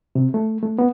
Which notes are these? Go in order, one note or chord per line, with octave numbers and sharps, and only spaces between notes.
C3
A3
A3
B3